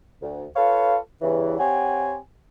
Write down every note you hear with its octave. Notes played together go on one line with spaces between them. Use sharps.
D2
F4 A4 B4 C#5 F5
E2 G2 C#3 E3
C4 G4 C#5 F#5 G#5